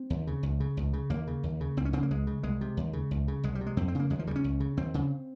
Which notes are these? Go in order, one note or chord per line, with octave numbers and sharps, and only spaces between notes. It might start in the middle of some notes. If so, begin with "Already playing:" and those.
Already playing: C4
D#2
C#3
C#2
C#3
C#2
C#3
D#2 A#3
C#3
D#2
C#3
C#2 C4
C#4
C#3 C4
A#3
C#2 G#3
C#3
C2 G#3
C3
D#2
C#3
C#2
C#3
C2 G#3
G3
C3
G#3
F2 C4
C4
C#3 A#3
D#2 G#3
F3
C#3 G3
C#4
C#2
C#3
D#2 C4
C#3